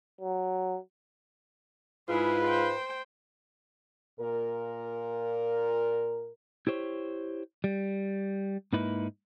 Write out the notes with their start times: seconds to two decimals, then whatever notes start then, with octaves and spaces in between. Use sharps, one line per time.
0.21 F#3
2.09 G#2 E4 F4 G#4 B4
2.44 C5 G5
4.20 A#2 A#4
6.67 E4 G4 C5 C#5
7.64 G3
8.73 G#2 A#3 D#4 E4 B4